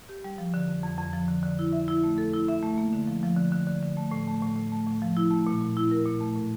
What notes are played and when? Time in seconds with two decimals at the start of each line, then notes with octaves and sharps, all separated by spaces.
0.09 G4
0.24 G3
0.38 F3
0.54 D3
0.68 F2
0.84 F2
0.98 F2
1.13 F3
1.28 D3
1.43 D3
1.59 E4
1.73 E5
1.88 E4
2.04 A3
2.18 A4
2.33 E4
2.48 E5
2.63 A3
2.78 A#3
2.92 D3
3.07 F3
3.23 F3
3.37 D3
3.52 D3
3.67 D3
3.82 D3
3.97 A3
4.11 A2
4.27 A3
4.42 A2
4.56 A2
4.72 A3
4.87 A2
5.02 F3
5.17 E4
5.31 A3
5.47 A#2
5.61 A#2
5.77 E4
5.91 A#4
6.06 A#2
6.21 A3
6.36 A2